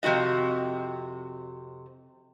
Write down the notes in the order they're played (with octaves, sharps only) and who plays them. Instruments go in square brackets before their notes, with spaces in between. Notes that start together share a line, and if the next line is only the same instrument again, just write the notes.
[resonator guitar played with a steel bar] F2 C3 G3 F#4 D#5